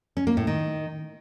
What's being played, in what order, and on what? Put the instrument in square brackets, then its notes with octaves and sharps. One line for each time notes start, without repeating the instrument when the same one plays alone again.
[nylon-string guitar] C#4
A#3
A2
D#3